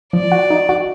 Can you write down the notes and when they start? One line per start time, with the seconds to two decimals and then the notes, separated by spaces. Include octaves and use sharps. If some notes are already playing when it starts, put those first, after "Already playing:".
0.13 F3 D5
0.32 F#4
0.50 D#4
0.69 F#4